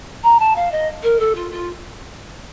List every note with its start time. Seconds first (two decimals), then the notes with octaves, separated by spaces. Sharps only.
0.23 A#5
0.39 A5
0.56 F5
0.72 D#5
1.03 A#4
1.19 A4
1.35 F4
1.51 F4